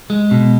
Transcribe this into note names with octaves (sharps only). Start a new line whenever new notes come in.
G#3
B2